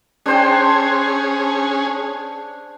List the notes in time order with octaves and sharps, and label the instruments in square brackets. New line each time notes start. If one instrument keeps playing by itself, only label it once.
[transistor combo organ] C#4 G#4 [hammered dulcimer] D4 C5 G5